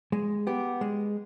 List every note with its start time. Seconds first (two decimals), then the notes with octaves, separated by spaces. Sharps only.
0.12 G#3
0.47 B3 G4
0.81 G#3